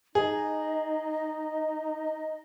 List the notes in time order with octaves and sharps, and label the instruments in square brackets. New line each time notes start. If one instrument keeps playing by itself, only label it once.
[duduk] D#4 [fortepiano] G#4 [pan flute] D#5